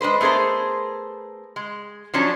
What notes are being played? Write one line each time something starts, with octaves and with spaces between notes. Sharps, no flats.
G#3 D4 B4 C5
A3 B3 G#4 A#4 C5
G#3
F3 F#3 C#4 D4